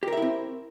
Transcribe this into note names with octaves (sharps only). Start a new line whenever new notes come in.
C4 E4 G4 A#4 E5